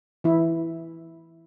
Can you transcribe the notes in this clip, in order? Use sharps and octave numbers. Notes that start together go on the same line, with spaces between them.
E3 E4